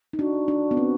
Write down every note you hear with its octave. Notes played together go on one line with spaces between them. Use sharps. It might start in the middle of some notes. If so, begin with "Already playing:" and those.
D#4
D4 F#4
D4
B3
C4